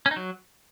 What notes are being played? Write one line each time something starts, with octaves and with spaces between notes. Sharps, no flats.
C#4
D#4
F#3